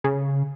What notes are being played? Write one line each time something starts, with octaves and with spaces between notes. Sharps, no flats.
C#3